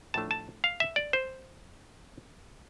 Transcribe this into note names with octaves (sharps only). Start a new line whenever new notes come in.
A2 F3 A3 D4 A5
A5
F5
E5
D5
C5